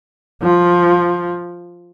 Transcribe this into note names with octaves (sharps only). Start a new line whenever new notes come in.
F3